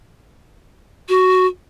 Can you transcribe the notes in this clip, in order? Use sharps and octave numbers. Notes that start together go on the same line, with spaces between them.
F#4